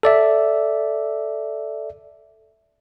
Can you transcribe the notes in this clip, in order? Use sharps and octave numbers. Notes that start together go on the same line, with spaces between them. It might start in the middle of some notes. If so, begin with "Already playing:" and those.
A4 D5 E5